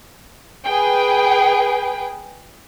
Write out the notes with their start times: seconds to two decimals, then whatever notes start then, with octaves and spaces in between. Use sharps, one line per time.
0.66 G#4 B4 G5